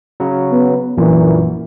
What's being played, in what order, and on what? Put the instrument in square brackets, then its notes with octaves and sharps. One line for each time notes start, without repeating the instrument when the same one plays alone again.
[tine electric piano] C#3 F#3
[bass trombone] B3
[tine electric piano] A#1 F#2 A#2 [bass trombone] E3